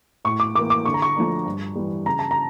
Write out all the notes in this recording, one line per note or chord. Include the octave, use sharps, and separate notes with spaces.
A2 C#6
D6
E3 A#3 D6
D6
D3 C#6
A#5
C#6
F3 A3 D4
G2
E3 G3
C#3 A#5
A5
A#5